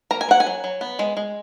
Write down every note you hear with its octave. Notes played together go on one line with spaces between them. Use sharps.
A#3 A#5
G#5
A#3 F#5
G#5
F#3
F#3
B3
G#3
G#3